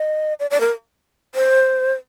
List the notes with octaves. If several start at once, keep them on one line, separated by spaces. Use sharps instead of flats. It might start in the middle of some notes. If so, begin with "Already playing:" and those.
Already playing: D#5
D5
D5
A#4
C5